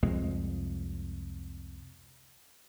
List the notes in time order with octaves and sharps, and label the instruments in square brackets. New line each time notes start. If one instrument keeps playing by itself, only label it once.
[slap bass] C2 F2 G#3